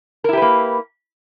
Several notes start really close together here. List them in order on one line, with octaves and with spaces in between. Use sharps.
A#4 E4 G4 B4 A#3